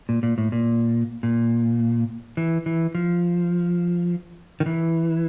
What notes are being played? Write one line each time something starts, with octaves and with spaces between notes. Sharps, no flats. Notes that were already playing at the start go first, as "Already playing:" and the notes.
A#2
A#2
A2
A#2
A#2
E3
E3
F3
D#3
E3